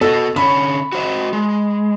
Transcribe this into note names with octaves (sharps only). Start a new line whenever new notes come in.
B3 F#4 A4 D#5
D3 C#4 C#5 B5
F#4 C5 D#5
G#3